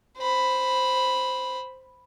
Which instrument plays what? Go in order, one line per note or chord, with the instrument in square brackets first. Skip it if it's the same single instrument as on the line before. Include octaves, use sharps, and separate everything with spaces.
[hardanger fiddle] C5 B5